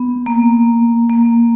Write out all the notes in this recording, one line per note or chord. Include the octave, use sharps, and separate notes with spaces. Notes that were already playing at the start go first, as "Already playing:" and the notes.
Already playing: B3
A#3
A#3